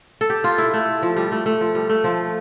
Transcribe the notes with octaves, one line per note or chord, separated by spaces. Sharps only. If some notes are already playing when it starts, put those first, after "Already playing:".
A4
G4
F4
E4
A3
F3
G3
A3
A3
F3
G3
A3
F3